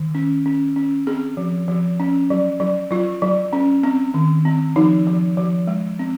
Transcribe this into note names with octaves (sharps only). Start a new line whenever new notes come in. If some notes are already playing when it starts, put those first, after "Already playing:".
Already playing: D#3
C#4
C#4
C#4
C4 G#4
F3
F3
C#4
F#3
F#3
F#3 F4
F#3
C#4
C4
D#3
C4
F3 D#4
F3
F3
G#3
C4